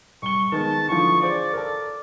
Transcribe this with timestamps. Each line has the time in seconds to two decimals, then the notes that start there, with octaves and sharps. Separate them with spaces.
0.22 C2 C#6 G7
0.52 D#3 G#3 B3 A5
0.88 D3 E3 F3 C#6
1.21 F4 G#4 C5 D5
1.53 A4 A#4